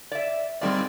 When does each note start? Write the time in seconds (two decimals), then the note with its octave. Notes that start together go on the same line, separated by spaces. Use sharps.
0.12 D5 E5
0.61 A#2 D#3 G3 G#3 C4 D5